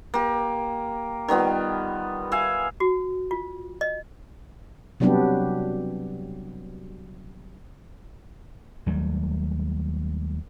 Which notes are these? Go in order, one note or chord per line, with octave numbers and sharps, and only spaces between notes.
A#3 G4
D#3 G3 B3 F4
E5 F5 G#5
F#4
F4
D#5
C3 F#3 G3 B3 D4 G4
D#2 F#3 G3 A3